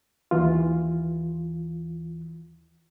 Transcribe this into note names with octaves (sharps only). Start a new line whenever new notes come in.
D#2 E3 F4